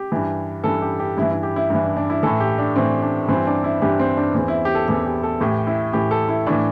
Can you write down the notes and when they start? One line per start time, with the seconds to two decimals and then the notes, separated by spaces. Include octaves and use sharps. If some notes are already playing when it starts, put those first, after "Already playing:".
Already playing: G4
0.12 G2 E3
0.64 G2 E3 A4
0.82 G4
0.99 G4
1.17 G2 E4
1.22 E3
1.30 E4
1.43 G4
1.56 E4
1.70 G2 E3
1.83 D4
1.97 D4
2.10 E4
2.23 A2 E3 A4
2.40 G4
2.58 D4
2.76 A2 E3 C4
3.02 D4
3.28 G2 E3 C4
3.47 D4
3.64 E4
3.82 G2 E3 G4
3.99 C4
4.17 D4
4.34 E2 E3 C4
4.48 E4
4.65 G4
4.75 A4
4.88 E2 E3 G4
5.05 G4
5.23 A4
5.40 A2 E3 G4
5.67 E4
5.93 A2 E3 G4
6.11 A4
6.29 E4
6.47 A2 E3 D4